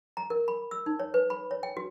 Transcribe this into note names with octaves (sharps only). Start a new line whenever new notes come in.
A#5
A#4
B5
E6
D#4
C#5
B4
B5
C#5
G5
F#4